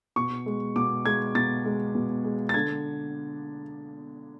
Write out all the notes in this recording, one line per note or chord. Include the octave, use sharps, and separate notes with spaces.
B2 C#6
G#3
B2 D6
G#3 G#6
B2 A6
G#3
B2
G#3
A6
D3 G#6